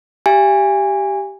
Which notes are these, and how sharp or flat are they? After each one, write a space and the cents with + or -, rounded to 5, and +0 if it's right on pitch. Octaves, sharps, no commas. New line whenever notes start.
G4 -5 E5 +45 G#5 -20